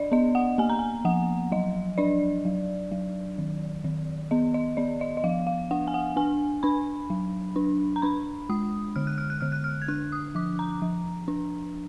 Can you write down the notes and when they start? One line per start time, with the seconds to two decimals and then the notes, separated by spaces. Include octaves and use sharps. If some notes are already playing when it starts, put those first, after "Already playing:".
Already playing: D4 D5 D#5
0.12 B3 D#5
0.35 F#5
0.58 A#3 G#5
0.70 A#5
0.79 G#5
1.05 F3 F#5
1.52 F#3 D#5
1.98 D4 D5
2.45 F#3
2.92 F#3
3.38 D#3
3.84 D#3
4.31 B3 D#5
4.54 D#5
4.77 B3 D5
5.01 D#5
5.17 D#5
5.24 F3 F5
5.47 F5
5.71 D4 F#5
5.88 G#5
5.94 F#5
6.16 D4 G#5
6.63 D4 B5
7.10 F#3
7.56 D4
7.96 A#5
8.02 D4 B5
8.49 G#3 D#6
8.96 D3 F6
9.07 F#6
9.18 F6
9.30 F#6
9.41 D3 F6
9.52 F#6
9.64 F6
9.82 G#6
9.88 D4 F#6
10.12 D#6
10.35 F3 D6
10.59 A#5
10.82 F3
11.28 D4